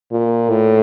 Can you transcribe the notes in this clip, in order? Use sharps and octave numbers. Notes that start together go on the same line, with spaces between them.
A#2
A2